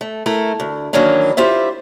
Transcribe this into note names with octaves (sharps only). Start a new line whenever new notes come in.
A3
A3 E4 A#4
D2
D#3 E3 F#3 A#3 C#4 D4
E4 F4 G4 C5 E5